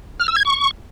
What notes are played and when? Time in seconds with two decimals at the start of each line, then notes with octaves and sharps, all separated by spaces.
0.20 F6
0.28 E6
0.36 G#6
0.45 C#6